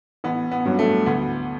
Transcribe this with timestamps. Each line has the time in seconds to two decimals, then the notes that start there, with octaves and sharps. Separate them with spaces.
0.24 A1 B3
0.51 B3
0.65 G2 F#3
0.79 A3
1.06 D2 B3